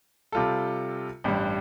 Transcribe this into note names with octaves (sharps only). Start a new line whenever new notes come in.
C3 G3 F4 A4
A1 G2 G3